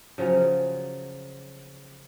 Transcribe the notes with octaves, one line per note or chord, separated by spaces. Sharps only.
C#3 F3 F#3 C#4